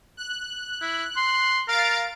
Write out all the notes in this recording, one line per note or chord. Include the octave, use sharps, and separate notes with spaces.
F#6
E4
C6
A#4 F5 A6 D7